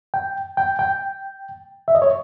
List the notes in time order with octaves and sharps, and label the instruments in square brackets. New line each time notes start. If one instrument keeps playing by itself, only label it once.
[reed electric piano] G5
G5
G5
E5
D#5
C#5